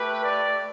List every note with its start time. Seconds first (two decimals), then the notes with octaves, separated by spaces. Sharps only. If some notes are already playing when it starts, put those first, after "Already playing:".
Already playing: A3 G4 B4
0.23 D5